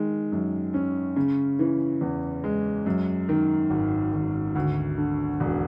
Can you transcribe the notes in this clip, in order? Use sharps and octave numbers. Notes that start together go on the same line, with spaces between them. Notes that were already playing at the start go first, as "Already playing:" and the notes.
Already playing: D#3 G#3
F#2
C#4
C#3
E3
E2
G#3
F#2
D#3
G#1
G#1
D2
D3
E1